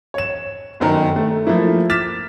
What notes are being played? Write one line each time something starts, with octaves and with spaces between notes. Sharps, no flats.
C#5 E7
G1 F#2 D#3
A3
F3 A3 A#3 E4
D6 F6 A6 B6 E7